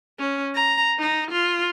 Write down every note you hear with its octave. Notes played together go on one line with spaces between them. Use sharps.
C#4
A#5
D#4
F4